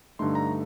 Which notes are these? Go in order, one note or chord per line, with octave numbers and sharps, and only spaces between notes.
G2 D3 A3 D#4 C6
A#5